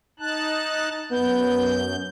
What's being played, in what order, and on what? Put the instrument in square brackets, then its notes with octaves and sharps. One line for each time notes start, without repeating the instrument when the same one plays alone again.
[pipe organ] D#4 A5 F#6
[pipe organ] F#2 G6 [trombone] B3